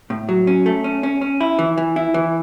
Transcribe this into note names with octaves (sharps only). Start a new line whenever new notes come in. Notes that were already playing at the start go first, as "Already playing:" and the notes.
A2
F#3
C#4
A3
C#4
C#4
C#4
E4
E3
E3
E4
E3